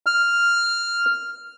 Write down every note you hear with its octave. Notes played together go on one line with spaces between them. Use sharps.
F6